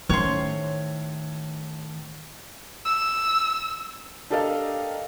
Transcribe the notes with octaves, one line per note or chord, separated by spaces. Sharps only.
A2 D#3 C#4 C5 C#5 C6
E6
D4 G4 A4 A#4 D#5 F5